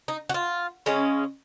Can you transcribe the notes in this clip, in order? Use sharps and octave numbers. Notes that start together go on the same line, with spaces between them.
D#4
F#4
F4
C#3 G#3 C#4